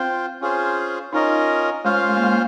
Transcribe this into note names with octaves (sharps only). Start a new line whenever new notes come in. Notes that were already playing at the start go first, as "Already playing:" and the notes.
Already playing: C4 F4 C5 G5
C#4 F4 G#4 C5
C#4 D#4 F4 A#4 D#5
G#3 C#4 F4 C5 F5
G#3
A#3
G#3
A#3